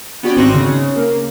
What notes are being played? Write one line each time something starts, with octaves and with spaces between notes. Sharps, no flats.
B3 C#4 F#4 D5 G5
G#1 C4 D#4 C#6 F#6 A#6
C#3
A#3